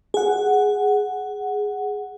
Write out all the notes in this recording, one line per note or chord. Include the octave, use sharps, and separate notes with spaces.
G#4 F#5